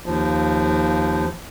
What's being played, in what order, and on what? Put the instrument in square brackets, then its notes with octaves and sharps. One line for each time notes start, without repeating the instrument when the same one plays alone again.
[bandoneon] D#2 F3